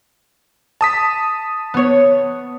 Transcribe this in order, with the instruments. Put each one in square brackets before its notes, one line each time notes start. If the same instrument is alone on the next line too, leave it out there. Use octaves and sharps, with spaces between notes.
[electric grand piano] A5 D#6 B6
[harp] B3 C#5